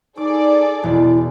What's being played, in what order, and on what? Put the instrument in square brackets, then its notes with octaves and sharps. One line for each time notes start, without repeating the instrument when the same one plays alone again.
[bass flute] D#4 [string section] G#4 A4 D5 [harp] D6
[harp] E1 [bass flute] E4